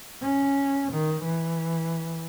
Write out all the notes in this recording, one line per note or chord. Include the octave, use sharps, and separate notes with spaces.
C#4
D#3
E3